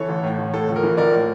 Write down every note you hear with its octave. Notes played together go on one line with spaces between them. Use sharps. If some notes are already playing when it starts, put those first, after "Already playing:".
Already playing: E3 A4 C#5
A1
A2
A1
A2 A4
A#1
A#4
E3
A#1 A#4 D5
A2